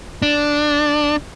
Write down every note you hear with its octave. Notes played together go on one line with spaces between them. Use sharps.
D4